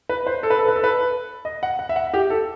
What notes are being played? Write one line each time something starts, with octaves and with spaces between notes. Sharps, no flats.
B4
C5
A4
B4
A4
B4
A4
B4
D#5
F#5
F#5
E5
F#5
G4
A4